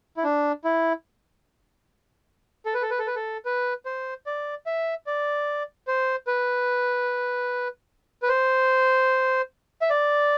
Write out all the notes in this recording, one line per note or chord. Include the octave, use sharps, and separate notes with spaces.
E4
D4
E4
A4
B4
A4
B4
A4
B4
A4
B4
C5
D5
E5
D5
C5
B4
B4
C5
E5
D5